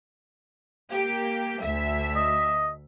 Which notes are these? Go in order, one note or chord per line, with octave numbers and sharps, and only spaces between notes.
A#3 G4
D2 E5 B6
D#5